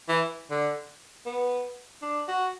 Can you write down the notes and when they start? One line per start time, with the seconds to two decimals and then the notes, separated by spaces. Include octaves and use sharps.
0.08 E3
0.51 D3
1.26 B3
2.02 D4
2.28 F#4